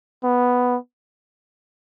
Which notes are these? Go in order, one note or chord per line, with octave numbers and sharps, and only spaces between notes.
B3